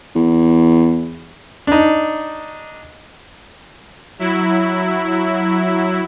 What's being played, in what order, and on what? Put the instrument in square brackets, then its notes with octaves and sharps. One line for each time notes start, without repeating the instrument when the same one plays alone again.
[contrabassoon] E2
[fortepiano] D4 D#4
[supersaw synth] F#3 E4